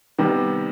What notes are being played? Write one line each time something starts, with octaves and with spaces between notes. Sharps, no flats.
C3 D#3 G3 B3